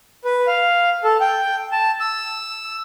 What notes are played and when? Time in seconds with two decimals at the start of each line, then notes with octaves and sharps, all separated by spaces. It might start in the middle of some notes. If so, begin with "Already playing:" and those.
0.25 B4
0.47 F5
1.04 A4
1.21 G5
1.72 A5
2.00 E6